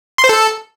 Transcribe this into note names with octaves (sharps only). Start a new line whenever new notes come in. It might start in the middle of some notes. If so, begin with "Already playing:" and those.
C6
C5
A4